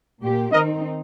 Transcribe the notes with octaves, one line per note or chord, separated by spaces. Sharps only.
A#2 A#3 G4
D#3 C4 D#4 A#4 D#5